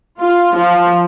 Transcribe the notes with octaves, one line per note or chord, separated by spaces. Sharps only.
F4
F3